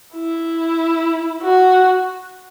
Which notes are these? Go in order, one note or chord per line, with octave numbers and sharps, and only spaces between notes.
E4
F#4